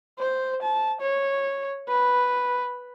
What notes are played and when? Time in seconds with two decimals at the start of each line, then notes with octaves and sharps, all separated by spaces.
0.19 C5
0.62 A5
1.01 C#5
1.88 B4